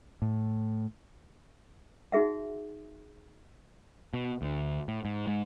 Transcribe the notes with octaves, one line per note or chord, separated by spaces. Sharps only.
A2
D#4 F#4 G#4 E5 F#5
B2
D2
A2
G#2
G#2